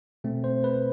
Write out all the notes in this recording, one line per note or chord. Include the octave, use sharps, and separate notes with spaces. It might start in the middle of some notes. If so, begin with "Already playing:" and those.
B2 A3 C4
C5
B4